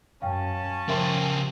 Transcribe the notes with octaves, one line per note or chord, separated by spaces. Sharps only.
F#2 C#4 F5 G5 A5
C#3 F3 G4 A#4 E5 C6